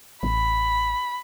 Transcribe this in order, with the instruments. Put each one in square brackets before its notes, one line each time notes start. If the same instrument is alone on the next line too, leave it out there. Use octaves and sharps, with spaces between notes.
[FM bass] A1 [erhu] B5